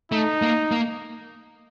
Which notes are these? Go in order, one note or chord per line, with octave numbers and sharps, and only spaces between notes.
A3 D#4
A#3
A#3